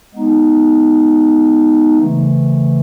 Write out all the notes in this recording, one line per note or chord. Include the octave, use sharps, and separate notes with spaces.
G#3 B3 D#4
C#3 E3 A3